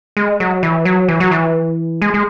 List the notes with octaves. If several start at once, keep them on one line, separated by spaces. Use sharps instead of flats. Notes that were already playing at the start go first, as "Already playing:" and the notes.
G#3
F#3
E3
F#3
E3
F#3
E3
G#3
G#3